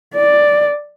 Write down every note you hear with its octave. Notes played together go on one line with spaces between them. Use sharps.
D5